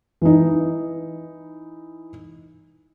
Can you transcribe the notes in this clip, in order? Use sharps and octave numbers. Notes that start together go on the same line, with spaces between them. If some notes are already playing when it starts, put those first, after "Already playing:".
E3 D#4